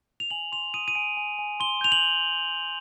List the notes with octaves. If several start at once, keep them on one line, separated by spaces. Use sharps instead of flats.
F7
G#5 F#7
C6 F7
D#6 D#7
D#7
G#5 D7
G#5
G#5
C6 G7
G6 F7
F#7